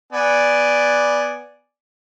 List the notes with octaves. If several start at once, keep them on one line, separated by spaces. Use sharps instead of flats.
B3 D5 G#5